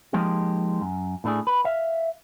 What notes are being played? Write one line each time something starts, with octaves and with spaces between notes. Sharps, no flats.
F3 G#3 A#3 D#4 G4
F#2
A2 A3 D4 G#4
B4
E5 F5